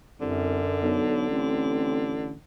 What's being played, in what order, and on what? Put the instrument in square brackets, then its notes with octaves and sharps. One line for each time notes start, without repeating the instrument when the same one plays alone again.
[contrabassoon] C2 [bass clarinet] F#2 [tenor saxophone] D3
[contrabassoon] B1
[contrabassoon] A1 [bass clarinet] C4